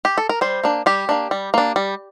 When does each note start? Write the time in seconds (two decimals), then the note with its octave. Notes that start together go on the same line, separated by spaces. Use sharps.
0.05 G4
0.18 A4
0.29 A#4
0.41 G3 C5
0.64 A#3 D4
0.86 G3 G4
1.09 A#3 D4
1.31 G3
1.54 A#3 D4
1.76 G3